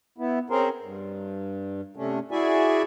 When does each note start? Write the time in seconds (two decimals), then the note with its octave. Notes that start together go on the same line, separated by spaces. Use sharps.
0.18 B3 E4
0.50 C4 C#4 G#4 A#4 C5
0.81 G2
1.96 C3 A3 C#4 D4
2.31 E4 F#4 G#4 D5 E5 G#5